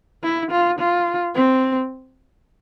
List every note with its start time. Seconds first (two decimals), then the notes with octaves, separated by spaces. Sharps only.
0.23 E4
0.51 F4
0.79 F4
1.35 C4